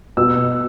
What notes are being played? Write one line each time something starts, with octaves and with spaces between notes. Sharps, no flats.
B2 E6